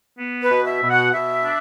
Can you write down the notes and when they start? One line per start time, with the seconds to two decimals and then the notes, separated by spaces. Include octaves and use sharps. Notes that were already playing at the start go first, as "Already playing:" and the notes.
0.19 B3
0.43 B4
0.51 B2
0.67 E5
0.81 B2
0.90 F#5
1.14 B2 E5
1.45 D4